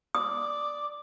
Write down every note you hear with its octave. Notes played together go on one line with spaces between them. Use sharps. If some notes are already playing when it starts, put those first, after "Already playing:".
D5 D#6